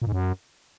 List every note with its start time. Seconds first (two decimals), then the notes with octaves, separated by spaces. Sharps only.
0.02 A#2
0.07 G#2
0.12 F#2